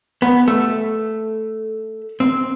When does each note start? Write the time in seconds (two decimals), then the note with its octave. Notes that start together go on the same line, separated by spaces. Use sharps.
0.22 B3
0.48 A3
2.20 C4